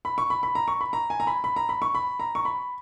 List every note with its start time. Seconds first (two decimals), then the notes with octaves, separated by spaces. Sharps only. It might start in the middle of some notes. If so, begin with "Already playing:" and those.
0.05 B5
0.18 C#6
0.30 B5
0.43 B5
0.55 A#5
0.68 C#6
0.81 B5
0.93 A#5
1.10 G#5
1.20 A#5
1.27 B5
1.44 B5
1.56 A#5
1.69 B5
1.82 C#6
1.95 B5
2.20 A#5
2.35 C#6
2.45 B5